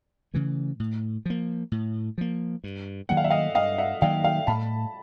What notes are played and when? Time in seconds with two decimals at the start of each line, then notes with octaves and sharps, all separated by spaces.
0.34 C#3 E3 A3
0.80 A2
1.26 F3 A#3
1.72 A2
2.18 F3 A#3
2.64 G2
3.09 D#3 F#3 A#3 F#5
3.17 F5
3.24 E5
3.30 D#5 F5
3.55 G2 D#5 F5
3.78 E5 F#5
4.01 D#3 F#3 A#3 F5 G5
4.24 F5 G5
4.47 A2 A5 B5